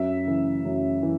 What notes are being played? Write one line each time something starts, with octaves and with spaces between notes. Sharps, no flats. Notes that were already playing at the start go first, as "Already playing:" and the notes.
Already playing: F#2 E5
C#3 E3
F#2
E3